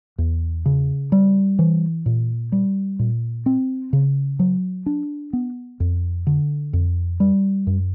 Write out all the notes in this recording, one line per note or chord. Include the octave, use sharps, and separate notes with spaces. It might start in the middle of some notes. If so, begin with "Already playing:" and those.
E2
C#3
G3
E3
A#2
G3
A#2
C4
C#3
F#3
D4
B3
F2
D3
F2
G3
F#2